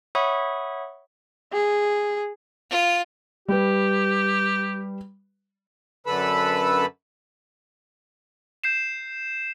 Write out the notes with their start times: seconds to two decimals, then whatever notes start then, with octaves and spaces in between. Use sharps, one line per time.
0.15 C#5 E5 F#5 B5 C#6 D#6
1.53 G#4
2.70 F4
3.48 G3 G4 B4
6.07 F#2 D3 A4 B4 B5 E6
8.64 G6 C7 E7